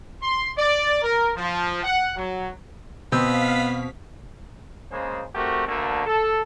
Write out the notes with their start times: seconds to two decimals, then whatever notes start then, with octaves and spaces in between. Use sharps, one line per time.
0.22 C6
0.58 D5
1.03 A#4
1.36 F3
1.84 F#5
2.16 F#3
3.12 B2 B3 C4 F5 B6
4.90 C#3 G#3 A#3 G#4 C5
5.35 A3 C4 F#4 G4 A#4
5.68 D2 D3 A3 A#3
6.06 A4